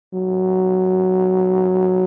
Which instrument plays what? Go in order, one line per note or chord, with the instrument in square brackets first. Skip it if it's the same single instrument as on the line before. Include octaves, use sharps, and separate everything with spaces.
[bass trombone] F#3